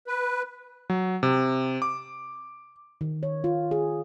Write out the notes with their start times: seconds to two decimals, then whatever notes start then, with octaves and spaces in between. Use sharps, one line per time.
0.07 B4
0.90 F#3
1.23 C3
1.82 D6
3.01 D#3
3.23 C#5
3.44 F4
3.71 G#4